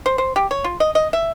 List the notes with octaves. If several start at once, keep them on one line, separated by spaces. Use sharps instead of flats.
C5
C5
G4
C#5
F4
D#5
D#5
E5